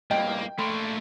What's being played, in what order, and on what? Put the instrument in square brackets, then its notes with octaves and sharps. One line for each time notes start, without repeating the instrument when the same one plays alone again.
[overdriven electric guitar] G2 A#2 [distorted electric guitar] A#3 [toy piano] D#5 [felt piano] G5
[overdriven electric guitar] A3 [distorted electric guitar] A#3 D4 [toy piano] B5 C6